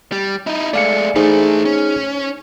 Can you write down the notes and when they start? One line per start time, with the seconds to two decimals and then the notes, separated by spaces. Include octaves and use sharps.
0.12 G3
0.47 D#4 E4
0.73 G#3 A3 D5 F5 C#7
1.16 E3 A3 D#4 G#4 C5
1.65 C#4